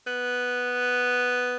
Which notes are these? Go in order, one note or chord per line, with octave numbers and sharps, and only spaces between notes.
B3